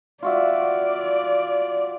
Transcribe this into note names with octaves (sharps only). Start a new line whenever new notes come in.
F4 F#4 D5 E5